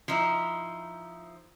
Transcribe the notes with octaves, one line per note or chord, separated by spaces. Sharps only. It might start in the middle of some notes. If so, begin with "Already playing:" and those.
F3 D#4 E4